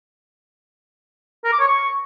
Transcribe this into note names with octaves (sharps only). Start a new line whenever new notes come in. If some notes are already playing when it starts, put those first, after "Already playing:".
A#4
D6
C#5
C#6